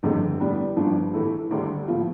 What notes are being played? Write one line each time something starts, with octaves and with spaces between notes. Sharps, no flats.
G1 F2 D3 A3 C4
A2 G3 B3 D4
G1 G2 F3 B3
A2 E3 A3 E4
D2 D3 G3
A2 F3 B3 F4